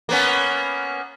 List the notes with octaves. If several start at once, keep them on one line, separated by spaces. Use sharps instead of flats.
A#3 B3 C#4